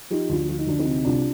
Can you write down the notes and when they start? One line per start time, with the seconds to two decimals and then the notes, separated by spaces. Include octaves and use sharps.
0.10 F3 D#4 G4
0.29 D2 D4 F4
0.49 F3 F4
0.58 D#4
0.67 D2 D4
0.78 C4 D#4
0.86 C3
1.05 C2 D4 F4